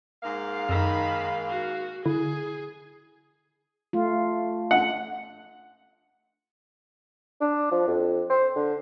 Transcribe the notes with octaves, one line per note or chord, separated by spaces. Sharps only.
G#2 A#3 F5
F#2 D#3 B5
F#4
D3 E4 G#4
A3 F4
F#5
D4
F3
F2
C5
D3